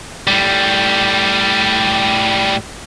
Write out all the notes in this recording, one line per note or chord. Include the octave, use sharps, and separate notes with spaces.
A2 G3